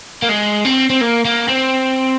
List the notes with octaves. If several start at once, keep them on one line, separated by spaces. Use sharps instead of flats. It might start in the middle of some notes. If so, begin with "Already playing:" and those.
A#3
G#3
C4
C4
A#3
A#3
C4